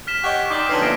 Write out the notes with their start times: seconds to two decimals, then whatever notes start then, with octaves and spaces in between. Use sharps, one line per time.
0.07 F6 B6 E7
0.24 G4 C#5 D#5 F#5 F#6
0.50 D#4 D5 G5 C6 D6
0.69 D3 F3 C#4 B4 D5 A5 E6 C7
0.81 A#3 B3 C#5 A#6 D7 E7